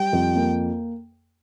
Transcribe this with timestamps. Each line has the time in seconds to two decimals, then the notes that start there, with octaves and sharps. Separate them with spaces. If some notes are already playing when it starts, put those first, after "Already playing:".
Already playing: G3 G5
0.13 F2
0.36 A#3